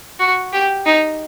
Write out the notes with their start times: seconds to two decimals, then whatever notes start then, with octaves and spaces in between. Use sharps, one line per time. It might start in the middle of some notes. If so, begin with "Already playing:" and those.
0.20 F#4
0.53 G4
0.86 D#4